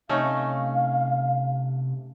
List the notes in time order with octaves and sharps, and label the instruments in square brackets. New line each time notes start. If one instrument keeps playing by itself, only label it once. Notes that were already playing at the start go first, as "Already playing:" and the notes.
[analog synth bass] C3 [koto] A3 C#4 D#4 [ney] F5